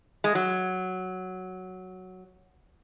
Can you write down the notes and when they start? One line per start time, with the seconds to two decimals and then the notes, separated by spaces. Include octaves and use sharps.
0.24 G#3
0.35 F#3